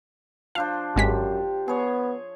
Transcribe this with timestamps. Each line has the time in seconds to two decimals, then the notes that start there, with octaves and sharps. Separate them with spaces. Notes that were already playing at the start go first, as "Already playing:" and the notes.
0.55 F3 D4 C5 F5
0.96 G#1 F#2 G#3 G4 B6
1.68 B3 G#4 C#5